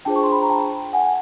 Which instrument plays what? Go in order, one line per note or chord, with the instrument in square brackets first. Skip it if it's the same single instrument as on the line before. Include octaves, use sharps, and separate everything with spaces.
[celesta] D4 F4 G#4 C5 G5 A5
C#6
C6
B5
A#5
G5 A5
F#5 G#5